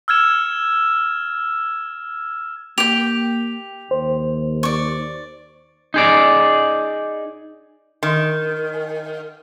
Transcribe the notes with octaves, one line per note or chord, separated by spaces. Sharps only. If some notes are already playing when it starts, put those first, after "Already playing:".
E6 F6 G#6 E7
A#3 G4 G5 F7
D#2 C5
D5 C#6
D#4 G#4 D5
D#3